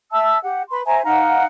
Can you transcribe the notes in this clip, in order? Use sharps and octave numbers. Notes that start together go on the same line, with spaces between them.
E5 A5 E6
G4 F#5
B4 B5 C6
C5 E5 G#5 A#5
D#4 F5 F#5 A#5